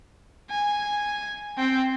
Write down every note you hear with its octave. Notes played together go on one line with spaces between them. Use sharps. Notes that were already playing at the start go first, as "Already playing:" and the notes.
G#5
C4 G5